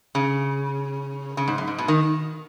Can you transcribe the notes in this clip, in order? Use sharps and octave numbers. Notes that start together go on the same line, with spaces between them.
C#3
C#3
G#2
F#2
G#2
B2
D#3